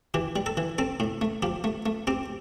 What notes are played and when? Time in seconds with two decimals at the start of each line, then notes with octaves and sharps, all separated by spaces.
0.14 E3 G4
0.36 G3
0.46 A4
0.57 E3
0.78 C4 A4
1.00 A2
1.21 A3
1.43 F3 G4
1.64 A3
1.86 A3
2.07 C4 G4